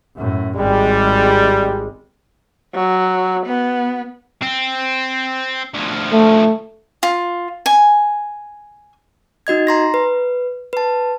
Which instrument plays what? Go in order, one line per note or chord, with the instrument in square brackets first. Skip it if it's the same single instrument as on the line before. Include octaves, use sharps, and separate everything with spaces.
[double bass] F#2 A2
[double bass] G#1 G#3 [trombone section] G3
[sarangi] F#3
B3
[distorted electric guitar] C4
D2 F3
[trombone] A3
[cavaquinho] F4
G#5
[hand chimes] D#4 F#4 D#5 G#6
A#5 C6 A#6
B4
B4 A5